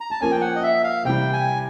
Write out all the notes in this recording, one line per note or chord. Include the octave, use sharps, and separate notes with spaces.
A#5
A5
F3 A#3 C#4 G#5
G5
F#5
D#5
E5
F5
C3 E3 G3 G5
G#5